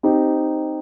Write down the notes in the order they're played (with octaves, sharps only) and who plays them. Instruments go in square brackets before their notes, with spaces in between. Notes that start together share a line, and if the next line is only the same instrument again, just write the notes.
[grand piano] C4 D#4 G4